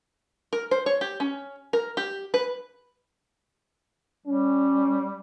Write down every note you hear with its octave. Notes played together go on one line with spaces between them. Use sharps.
A#4
C5
C#5
G4
C#4
A#4
G4
B4
G3 C#4